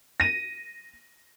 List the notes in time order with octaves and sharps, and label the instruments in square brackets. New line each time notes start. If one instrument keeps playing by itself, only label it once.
[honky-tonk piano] A#6 D#7